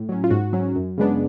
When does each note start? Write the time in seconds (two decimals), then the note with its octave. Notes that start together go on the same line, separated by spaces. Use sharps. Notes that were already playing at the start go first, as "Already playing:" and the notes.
Already playing: A2
0.09 F#3 C#4
0.24 F4
0.30 G#2 F#4
0.53 F#3 C#4
0.76 F#2
0.98 C#3 G#3 B3 D4